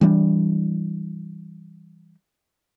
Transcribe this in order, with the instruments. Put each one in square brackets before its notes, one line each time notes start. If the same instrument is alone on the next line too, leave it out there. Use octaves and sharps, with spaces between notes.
[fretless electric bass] E3 G3 A3 D4